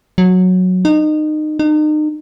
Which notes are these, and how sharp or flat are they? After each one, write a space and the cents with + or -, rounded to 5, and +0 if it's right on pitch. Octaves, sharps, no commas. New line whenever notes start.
F#3 -10
D#4 -25
D#4 -35